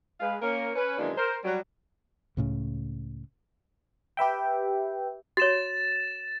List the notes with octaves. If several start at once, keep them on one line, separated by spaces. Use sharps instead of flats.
G#3 B4 F5
A#3 C#4 A#4
C#4 B4
F#2 D#3 E3 G#3 A#3 D4
A#4 C5
F#3 G3
C#2 A2 C#3
G4 B4 E5 G5
F#4 C#5 A6 E7